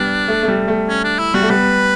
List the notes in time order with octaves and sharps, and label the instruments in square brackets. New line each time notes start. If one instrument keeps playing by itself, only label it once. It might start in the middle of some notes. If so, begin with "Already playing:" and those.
Already playing: [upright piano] G3 B3 [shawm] D4
[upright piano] A3
A3
G3
A3
[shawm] C#4
D4
E4
[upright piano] G3 [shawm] F#4
[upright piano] A3
[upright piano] G3 B3 [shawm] B4